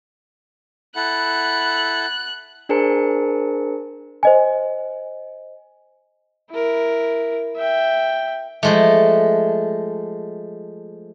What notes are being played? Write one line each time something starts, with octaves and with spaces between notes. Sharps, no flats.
E4 A4 F#5 F#6
D4 G#4 A#4 C5 A5 C#7
C5 D#5 G#5
E4 A#4
E5 G5
F3 G#3 A3